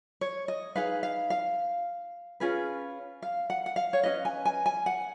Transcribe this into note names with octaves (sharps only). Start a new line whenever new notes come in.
C#5
D#5
D#4 G#4 B4 F5
F5
F5
C#4 F4 G#4 B4
F5
F#5
F#5
F5
C#5
C#4 G#4 B4 D#5
G#5
G#5
G#5
F#5